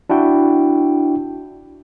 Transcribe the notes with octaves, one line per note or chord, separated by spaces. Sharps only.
D4 E4 F#4 G5